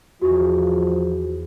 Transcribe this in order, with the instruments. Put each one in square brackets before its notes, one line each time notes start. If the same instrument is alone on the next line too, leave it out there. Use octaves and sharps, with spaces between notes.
[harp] E2 F4 G#4 [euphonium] F3 [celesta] F#4